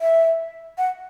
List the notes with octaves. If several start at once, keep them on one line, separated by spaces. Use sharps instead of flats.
E5
F#5